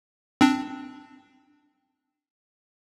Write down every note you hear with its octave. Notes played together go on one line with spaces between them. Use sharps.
C4 D4